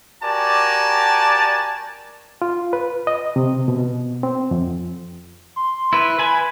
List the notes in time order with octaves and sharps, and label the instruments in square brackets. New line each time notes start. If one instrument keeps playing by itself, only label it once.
[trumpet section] F#4 G4 A#4 D5 G#5 A5
[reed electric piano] F4
B4
D#5
C3
B2
C4
F2
[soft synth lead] C6
[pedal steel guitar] E4 B4
B4 G#5 B5